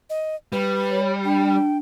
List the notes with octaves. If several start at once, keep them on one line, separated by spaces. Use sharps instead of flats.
D#5
G3 B4
C#5
D4 G5